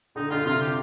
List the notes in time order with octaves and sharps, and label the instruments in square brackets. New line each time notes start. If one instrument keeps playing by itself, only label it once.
[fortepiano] D3 [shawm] D#4
[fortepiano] D3 [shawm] F4
[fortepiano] C3 [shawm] F4
[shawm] G4